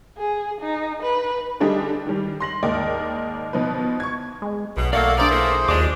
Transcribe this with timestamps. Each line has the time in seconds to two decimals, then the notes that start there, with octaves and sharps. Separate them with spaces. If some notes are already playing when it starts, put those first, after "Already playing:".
0.18 G#4
0.61 D#4
1.03 B4
1.60 D3 G3 D4 D#4 G4 G#4
2.07 D#3 G3
2.40 C6 A#6 F#7
2.63 D#2 G#2 A#4 D5 D#5 G5
3.53 B2 F3 D#4 B4
4.00 C#6 G#6
4.42 G#3
4.77 B1 B2
4.93 A3 A#3 D5 F5 F#5 E6
5.18 D4 G#4 A#4 C5 D5 A#5
5.31 E3 A3 A#3 G6
5.68 D#2 G#3 D4 F4 D6